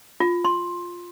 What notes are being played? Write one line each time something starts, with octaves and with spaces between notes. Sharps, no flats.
F4
C6